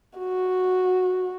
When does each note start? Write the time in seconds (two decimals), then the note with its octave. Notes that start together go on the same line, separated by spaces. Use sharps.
0.18 F#4